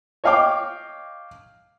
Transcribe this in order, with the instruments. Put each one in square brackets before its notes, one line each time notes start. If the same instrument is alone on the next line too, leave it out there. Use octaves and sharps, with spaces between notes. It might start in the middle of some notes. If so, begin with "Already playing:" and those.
[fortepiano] C#5 D#5 F5 G5 D6